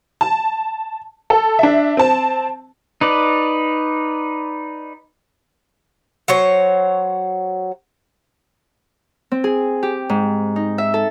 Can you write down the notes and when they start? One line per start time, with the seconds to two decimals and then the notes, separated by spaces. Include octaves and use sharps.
0.21 A5
1.30 A4
1.59 D4 E5
1.97 C4 A5
3.01 D#4 B4 D5
6.28 F#3 C5 C#5
9.32 C4
9.44 G#4
9.83 G4
10.09 G#2
10.56 D#4
10.78 E5
10.94 A4